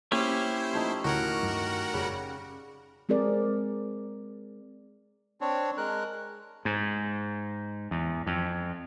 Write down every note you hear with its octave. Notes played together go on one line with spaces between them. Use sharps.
A#3 C#4 E4 G4 C5 G#5
F3 A3 D#4
D2 A2 D#3 F#4 A#4 F#5
G2
F#1 C#3 G3
G#3 C4 G#4 A#4 D5
C4 D4 C#5
G#3 A#4 F#6
G#2
E2
F2